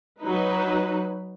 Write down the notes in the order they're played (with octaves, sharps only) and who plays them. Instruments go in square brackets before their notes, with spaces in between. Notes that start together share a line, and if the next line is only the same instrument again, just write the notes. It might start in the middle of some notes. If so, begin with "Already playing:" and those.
[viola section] F#3 D#4 B4